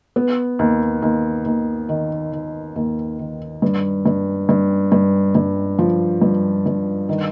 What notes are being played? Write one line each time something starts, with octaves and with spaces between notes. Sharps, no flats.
B3
D#2
D#2
D#2
D#3
D#3
D#2
D#3
G2
G2
G2
G2
G2
F3
G2
G2
D#3